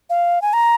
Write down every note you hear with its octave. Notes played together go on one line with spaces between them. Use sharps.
F5
G#5
A#5